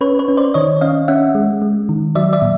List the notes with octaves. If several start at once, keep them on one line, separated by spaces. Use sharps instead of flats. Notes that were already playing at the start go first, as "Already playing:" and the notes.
C#4 B4 C#5
B4 C#5
C#4
C5 D5
D#3 C#5 D#5
C#4 D#5 F5
C#4 E5 F#5
G#3
G#3
D#3
F#3 D5 E5
D5 E5
A#2